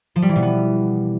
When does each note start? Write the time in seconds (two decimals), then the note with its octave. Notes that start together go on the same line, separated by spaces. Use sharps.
0.16 F3
0.22 G3
0.29 E3
0.36 B2
0.42 B3